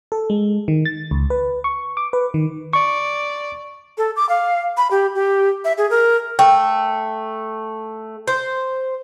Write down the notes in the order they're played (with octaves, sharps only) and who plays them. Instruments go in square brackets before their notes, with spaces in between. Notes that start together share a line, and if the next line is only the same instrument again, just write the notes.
[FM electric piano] A4
G#3
D#3
A6
C#2
B4
C#6
D6
B4
D#3
[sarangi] D5 [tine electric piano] C#6
[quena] A4
D6
F5
B5
G4
G4
E5
G#4
A#4
[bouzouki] A3 [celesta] G5
[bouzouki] C5